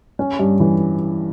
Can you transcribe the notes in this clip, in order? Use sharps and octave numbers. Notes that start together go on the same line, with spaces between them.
C#4
G2
E3